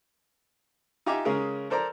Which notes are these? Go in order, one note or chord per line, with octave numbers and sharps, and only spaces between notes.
D#4 F4 G4 E5 G#5 D6
C#3 G#3 C#4 G#4 A#4
A4 A#4 C5 D5 A#5